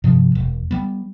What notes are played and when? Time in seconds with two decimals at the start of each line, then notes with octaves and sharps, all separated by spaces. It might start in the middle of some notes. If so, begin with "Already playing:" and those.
0.04 G2 C3 F3
0.35 E1
0.71 G3 B3